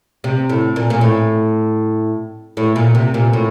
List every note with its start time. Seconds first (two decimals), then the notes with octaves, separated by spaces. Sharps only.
0.24 C3
0.50 A2
0.76 A#2
0.90 A#2
1.01 A2
2.57 A2
2.76 A#2
2.95 C3
3.14 A#2
3.33 A2